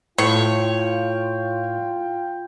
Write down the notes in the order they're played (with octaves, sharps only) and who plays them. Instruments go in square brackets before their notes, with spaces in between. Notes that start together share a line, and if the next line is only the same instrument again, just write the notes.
[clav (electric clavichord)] A2 [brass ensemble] F4 G5 [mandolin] C#5